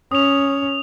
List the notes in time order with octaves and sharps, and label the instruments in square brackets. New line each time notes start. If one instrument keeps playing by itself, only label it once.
[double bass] C#4 [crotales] D#6 F7